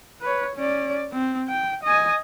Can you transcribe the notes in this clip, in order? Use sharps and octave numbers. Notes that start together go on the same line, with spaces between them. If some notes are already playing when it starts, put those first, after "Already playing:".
B4 C#5
C#4 D5
C4
G5
D#5 G#5